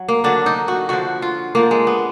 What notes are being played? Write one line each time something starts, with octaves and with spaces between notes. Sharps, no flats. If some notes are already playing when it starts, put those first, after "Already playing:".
Already playing: F#3
A#3
D3 F#3 D4
D#4
F#4
D3 F3 F#4
F4
D3 F3 A#3
G#3
B3